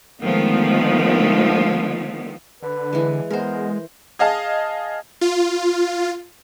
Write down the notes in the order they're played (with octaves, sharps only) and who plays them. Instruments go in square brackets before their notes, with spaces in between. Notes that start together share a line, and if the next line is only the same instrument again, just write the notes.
[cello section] D3 D#3 F3 G#3 A3 B3
[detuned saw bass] D3 [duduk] B4
[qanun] E3 G#3
[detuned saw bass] G#3 [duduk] B3 [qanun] A#4 C5
[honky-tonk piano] G#4 D#5 F5 A5
[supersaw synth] F4